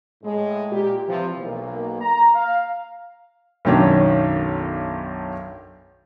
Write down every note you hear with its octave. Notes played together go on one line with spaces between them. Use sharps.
A2 G#3
A#2 G4
C3 E3 F3
B1 A#3
A#5
F5
B1 F#2 D#3 C#4 D4 C#5